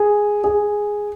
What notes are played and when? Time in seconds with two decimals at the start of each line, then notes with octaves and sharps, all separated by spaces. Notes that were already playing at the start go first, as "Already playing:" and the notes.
Already playing: G#4
0.44 G#4